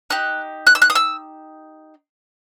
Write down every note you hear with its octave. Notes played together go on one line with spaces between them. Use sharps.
D#4 G4 F#6
F#6
E6
F#6
D#6
E6